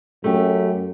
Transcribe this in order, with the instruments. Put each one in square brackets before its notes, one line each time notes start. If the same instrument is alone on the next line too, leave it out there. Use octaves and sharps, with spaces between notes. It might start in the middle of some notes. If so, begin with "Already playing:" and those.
[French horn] F#2 [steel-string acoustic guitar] A3 G4